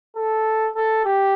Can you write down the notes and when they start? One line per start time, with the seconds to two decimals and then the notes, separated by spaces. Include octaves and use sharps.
0.16 A4
0.75 A4
1.05 G4